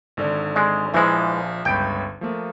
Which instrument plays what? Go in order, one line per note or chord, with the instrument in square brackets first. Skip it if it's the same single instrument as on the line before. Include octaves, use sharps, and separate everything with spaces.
[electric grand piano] G#1 D3 D5
[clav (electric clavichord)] G#3
[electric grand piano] A#1 F3 [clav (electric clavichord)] E3 G#3
[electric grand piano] G1 C#2 B5 [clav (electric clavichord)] G5
[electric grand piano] F3 A3 A#3